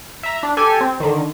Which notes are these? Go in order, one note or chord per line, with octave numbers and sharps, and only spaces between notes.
E5 A#5
D4
G4 A4 G#5
C4
D3 D#3